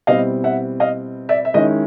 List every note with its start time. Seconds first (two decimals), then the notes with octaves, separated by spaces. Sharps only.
0.07 B2 G3 C4 E4 D#5 F5
0.44 E5 F#5
0.80 D#5 F5
1.29 D5 E5
1.45 E5
1.54 D#3 G#3 C#4 E4 D#5